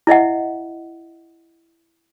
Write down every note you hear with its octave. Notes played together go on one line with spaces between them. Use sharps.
E4 D#5 E5 F#5